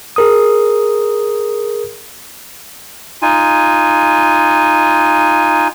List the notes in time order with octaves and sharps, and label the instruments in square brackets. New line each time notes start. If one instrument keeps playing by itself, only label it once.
[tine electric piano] G#4 A#4 D#6
[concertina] D#4 F4 G#5